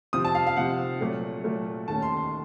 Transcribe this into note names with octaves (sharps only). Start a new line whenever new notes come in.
C3 F3 C4 D#6
A5
F5
F5
C3 F3 C4 F#5
A#2 F#3 A3
A#2 F#3 A3
D#2 D#3 A3 C#4 A5
C6
C6